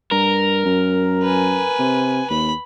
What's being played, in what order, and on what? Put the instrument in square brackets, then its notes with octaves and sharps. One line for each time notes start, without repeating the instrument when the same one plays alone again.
[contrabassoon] G2 [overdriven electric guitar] A#4
[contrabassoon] F#2
[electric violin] B4 G#5
[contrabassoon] C3
[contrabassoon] D#2 [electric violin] B5